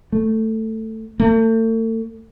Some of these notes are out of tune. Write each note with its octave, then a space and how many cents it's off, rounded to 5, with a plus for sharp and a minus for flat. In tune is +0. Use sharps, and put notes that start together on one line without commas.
A3 +10
A3 +40